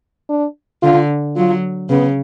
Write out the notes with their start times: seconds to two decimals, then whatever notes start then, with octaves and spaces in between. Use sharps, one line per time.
0.29 D4
0.83 D3 F4
1.36 F#3 F4
1.89 C#3 B3